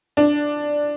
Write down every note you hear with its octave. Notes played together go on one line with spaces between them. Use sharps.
D4